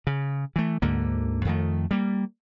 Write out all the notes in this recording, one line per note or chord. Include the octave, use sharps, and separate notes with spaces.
C#3
E3 A3
D2 G#2 D3 A#3
F2 D#3 A3
G3 A#3